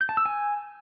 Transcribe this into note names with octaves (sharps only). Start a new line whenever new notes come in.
G6
A5
E6
G#5